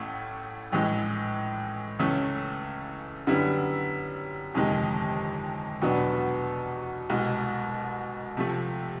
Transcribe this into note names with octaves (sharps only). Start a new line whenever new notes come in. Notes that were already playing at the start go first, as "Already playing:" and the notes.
Already playing: A1 A2 A3 C#4
A#1 A2 E3 G#3
C#2 C#3 E3 A3 C#4
F#2 D3 G3 B3 E4
G1 F2 C3 D#3 G#3
E2 B2 F#3 B3 D4
C2 B2 G#3
C3 F3 A3